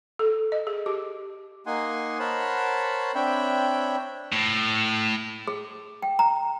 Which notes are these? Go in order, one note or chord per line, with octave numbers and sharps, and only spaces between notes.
A4
D#5
G#4
G4
A#3 D#4 F#5 G#5 C6
A#4 C5 C#5 F#5 A5 B5
C4 D4 C#5 E5 G5 B5
A2
G#4
G5
A#5